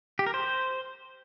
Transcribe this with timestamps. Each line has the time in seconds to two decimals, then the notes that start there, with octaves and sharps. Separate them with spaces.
0.19 G4
0.26 A#4
0.34 C5